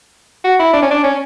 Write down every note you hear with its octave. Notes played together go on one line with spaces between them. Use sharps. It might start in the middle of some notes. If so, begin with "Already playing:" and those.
F#4
E4
D4
C#4
D4
C#4